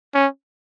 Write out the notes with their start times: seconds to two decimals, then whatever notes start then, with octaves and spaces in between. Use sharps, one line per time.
0.15 C#4